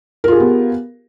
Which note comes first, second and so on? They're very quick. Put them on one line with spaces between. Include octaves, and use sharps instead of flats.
A#4 F4 G#4 G4 B3